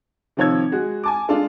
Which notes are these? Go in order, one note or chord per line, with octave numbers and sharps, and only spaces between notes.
C3 D#3 F3 C#5 E6 G#6
G#3 F#4
G#5 A5 D6
G#3 D4 F4 A4